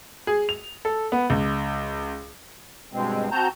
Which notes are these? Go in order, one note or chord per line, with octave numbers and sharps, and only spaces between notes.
G#4
F7
A4
B3
C#2
G2 B2 G#3 C4
C4 F#4 A5 A#5 G6